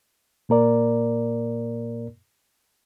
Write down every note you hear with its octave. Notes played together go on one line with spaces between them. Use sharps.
A#2 A#3 A#4 D5